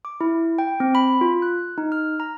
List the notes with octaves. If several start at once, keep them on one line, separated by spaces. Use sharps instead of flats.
D6
E4
G5
C4
B5
F4
F#6
D#4
F6
A#5